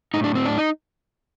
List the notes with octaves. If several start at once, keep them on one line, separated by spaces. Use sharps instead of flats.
A2 D#4
D4
C4
D4
D#4